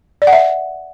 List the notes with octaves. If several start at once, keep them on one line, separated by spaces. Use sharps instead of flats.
D5
F#5
E5